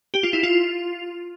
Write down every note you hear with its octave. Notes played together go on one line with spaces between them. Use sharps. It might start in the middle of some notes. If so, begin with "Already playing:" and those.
G4
F4
E4
F4